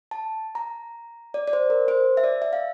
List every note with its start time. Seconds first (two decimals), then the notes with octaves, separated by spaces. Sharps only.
0.11 A5
0.55 A#5
1.34 D5
1.48 D5
1.53 C5
1.70 A#4
1.88 C5
2.17 E5
2.24 D5
2.42 E5
2.53 F5